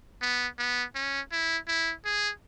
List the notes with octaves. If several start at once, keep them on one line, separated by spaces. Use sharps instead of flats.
B3
B3
C#4
E4
E4
G#4